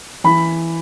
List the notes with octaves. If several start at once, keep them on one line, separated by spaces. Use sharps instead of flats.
E3 B5